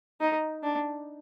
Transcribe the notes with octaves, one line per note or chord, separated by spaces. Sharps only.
D#4
D4